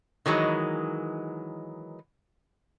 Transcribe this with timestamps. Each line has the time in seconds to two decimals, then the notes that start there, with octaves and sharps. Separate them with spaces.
0.26 D#3 E3 F#3 G#3